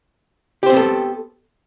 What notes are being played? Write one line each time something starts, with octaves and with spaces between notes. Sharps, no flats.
B3 C4 G4 A4 C5